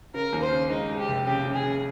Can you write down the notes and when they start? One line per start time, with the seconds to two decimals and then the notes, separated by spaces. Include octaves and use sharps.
0.14 C#3 A#4
0.33 D#2
0.42 C5
0.52 C#3
0.70 G#3 D#4
0.89 G#3
0.99 G4
1.08 F1
1.26 C#3 G4
1.45 C#3
1.54 G#4
1.64 C#3